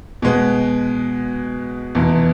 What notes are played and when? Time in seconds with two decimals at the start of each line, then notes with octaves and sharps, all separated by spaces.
0.22 B2 G#3 B3
1.95 F1 E2 B2